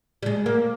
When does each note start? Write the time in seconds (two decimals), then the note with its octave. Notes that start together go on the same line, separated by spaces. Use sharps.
0.23 G3
0.26 G#3
0.46 A#3